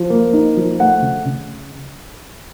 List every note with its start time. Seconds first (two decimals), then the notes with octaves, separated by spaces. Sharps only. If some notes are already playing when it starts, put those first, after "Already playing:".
Already playing: F3
0.10 A#3
0.33 D#4
0.57 F3
0.80 A3 F#5
1.02 C#3
1.25 C#3